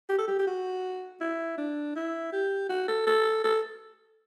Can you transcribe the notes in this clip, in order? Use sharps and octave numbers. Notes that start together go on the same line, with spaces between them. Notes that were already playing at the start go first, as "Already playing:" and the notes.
G4
A4
G4
G4
F#4
E4
D4
E4
G4
F#4
A4
A4
A4